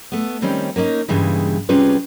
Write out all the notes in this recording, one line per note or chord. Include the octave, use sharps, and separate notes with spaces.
A3 B3
D#3 G3 C4 C#4
A#3 B3 C#4 D#4
G2 A#2 C#3 E3 G3 G#3
C3 G3 C#4 F4 G#4 B4